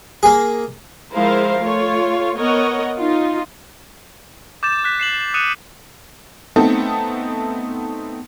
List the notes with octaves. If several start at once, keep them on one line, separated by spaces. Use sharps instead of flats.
A#3 G#4
F3 G#3 E4 A#4 C5 F5
A3 F4 C#5
B3 A#4 C#5 D#5 F#5
D#4 F4
D6 G6 A6 E7
F#6 B6
C7 E7 F#7
D#6 F#6 C#7 D#7 E7
A3 B3 C4 D#4 A4